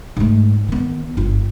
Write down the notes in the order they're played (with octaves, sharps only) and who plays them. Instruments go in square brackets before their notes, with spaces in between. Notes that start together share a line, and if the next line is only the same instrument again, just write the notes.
[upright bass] G#2 A3
D#3 B3
G1 F4